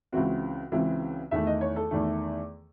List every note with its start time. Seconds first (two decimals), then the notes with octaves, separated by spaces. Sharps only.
0.12 C#2 C#3 E3 C4 F#4
0.72 C#2 C#3 E3 C4
1.31 E2 D#3 A3 E5
1.47 D#5
1.61 C#5
1.76 A4
1.91 E2 D#3 A3